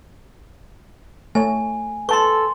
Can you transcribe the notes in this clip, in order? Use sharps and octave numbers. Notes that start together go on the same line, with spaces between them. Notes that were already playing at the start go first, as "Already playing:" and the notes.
A3 C#5 G#5
A4 B4 A5 C6 C#6